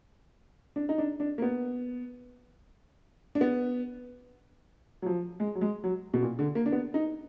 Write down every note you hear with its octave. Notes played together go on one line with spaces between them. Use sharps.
D4
D#4
D4
D4
A#3
B3
D4
B3
F#3
F3
G#3
F#3
G#3
F#3
B2
A#2
D3
A#3
D4
B3
D#4